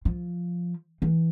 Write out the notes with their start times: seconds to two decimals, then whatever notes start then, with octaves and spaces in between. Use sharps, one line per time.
0.05 F3
1.02 E3